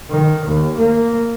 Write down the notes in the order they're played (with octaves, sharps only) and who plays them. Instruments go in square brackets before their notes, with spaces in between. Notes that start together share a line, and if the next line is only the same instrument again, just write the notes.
[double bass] D#3
D#2
A#3